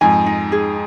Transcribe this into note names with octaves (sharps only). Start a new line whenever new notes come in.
F2 G#2 G#5
D#4
G#4